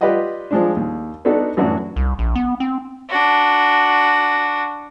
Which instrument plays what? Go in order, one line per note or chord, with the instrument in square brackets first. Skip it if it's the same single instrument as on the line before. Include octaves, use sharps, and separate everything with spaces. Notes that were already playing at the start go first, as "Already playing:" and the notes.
[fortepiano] F4 G4 B4 D5 D#5 F#5
F3 G#3 D4
D#2
B3 D4 D#4 F#4 A4 D5
F#2 A2 E3 D4 F#4
[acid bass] C2
A#1
B3
C4
[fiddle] D4 F#4